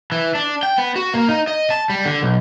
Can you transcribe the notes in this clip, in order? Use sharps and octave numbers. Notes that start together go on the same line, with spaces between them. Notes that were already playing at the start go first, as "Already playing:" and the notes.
E3
D4
G5
B3
F#4
A#3
D#4
D#5
A5
G3
D3
B1